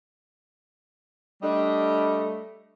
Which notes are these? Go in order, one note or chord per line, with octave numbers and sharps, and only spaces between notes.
G3 A3 D4 D#5